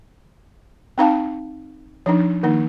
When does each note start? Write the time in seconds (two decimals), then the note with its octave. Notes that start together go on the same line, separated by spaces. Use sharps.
0.98 C4 D#4 F5 A5
2.06 F3 D4 D#4
2.43 D#3 A#3 D#4